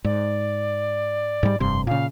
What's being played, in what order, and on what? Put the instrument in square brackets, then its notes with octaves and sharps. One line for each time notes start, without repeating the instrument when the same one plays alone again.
[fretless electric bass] G#2 [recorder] D5
[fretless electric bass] G#2 G3
[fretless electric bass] F1 G2 C3 [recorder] C6
[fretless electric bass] A#2 C#3 [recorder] F5